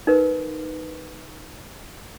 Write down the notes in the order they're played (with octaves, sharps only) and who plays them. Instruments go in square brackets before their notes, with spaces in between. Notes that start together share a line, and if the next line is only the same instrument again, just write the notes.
[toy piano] D#4 A#4 B4